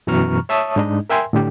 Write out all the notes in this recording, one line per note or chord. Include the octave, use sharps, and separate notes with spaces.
F#2 B2 E3 A#5 C#6 F6
C#5 E5 A5 C#6 D#6
G#2 G#3 D4 D#4 D#5
A#4 E5 G5 G#5 C6
A2 D3 G4